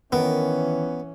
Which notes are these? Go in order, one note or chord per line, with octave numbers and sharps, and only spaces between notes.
D#3 E3 B3 C#4 A#4